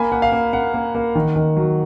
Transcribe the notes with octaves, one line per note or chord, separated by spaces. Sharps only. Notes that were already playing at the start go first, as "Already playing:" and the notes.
Already playing: A#3 G#5 B5
A#3 F#5
F5
A#3
A#3 F#5
A#3
A#3
D#3
D#3
F#3